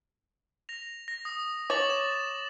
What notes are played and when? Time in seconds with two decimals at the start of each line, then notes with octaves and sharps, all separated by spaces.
0.69 A#6 F7
1.08 A#6
1.25 D#6
1.70 C#5 D6 A6 F#7
1.90 E7